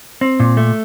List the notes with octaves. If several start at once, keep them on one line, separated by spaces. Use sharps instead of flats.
C4
A#2
A3